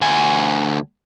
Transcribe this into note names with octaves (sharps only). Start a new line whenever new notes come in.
D2 G#5